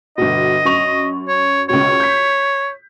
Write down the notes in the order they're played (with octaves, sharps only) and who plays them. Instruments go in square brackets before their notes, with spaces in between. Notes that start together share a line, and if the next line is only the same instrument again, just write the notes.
[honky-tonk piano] G1 B2 [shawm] D#5
[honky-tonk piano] F#2 C#6 F7
[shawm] C#5
[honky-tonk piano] C#2 B2 [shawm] C#5
[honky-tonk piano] G6 B6